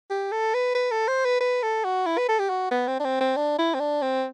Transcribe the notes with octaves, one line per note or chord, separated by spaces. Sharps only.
G4
A4
B4
B4
A4
C5
B4
B4
A4
F#4
E4
B4
A4
G4
F#4
B3
C4
D4
C4
C4
D4
E4
C4
D4
C4